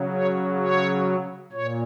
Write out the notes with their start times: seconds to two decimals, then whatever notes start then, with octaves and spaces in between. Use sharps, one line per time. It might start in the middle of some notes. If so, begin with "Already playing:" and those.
Already playing: C#3 F#3
0.13 C#5
0.59 C#5
1.52 A#2 C#5